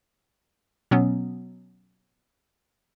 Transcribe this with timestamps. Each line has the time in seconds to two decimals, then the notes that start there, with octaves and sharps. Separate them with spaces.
0.91 B2 F#3 B3 C#4